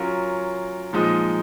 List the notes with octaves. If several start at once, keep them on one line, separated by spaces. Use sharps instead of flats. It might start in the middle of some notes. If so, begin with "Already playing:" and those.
Already playing: F#3 C#4 F4 A#4 C#5
A#2 F3 G#3 D#4